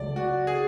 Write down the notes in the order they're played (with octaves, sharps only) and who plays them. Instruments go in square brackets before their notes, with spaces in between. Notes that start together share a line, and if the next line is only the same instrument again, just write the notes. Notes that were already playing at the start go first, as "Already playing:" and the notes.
Already playing: [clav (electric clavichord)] C#2 C#3 F#3 A3 [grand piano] D5
[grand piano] F#4
G#4